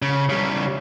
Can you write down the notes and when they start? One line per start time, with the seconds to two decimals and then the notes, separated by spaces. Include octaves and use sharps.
0.02 C#3
0.29 C#3 G3